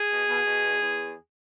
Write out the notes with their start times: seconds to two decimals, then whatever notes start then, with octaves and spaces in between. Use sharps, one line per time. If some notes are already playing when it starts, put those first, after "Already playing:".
Already playing: G#4
0.09 B2
0.27 B2
0.45 B2
0.62 E2
0.81 E2